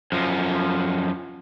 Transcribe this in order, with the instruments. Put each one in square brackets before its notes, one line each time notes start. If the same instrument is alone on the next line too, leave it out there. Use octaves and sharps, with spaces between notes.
[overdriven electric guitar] F#2 F3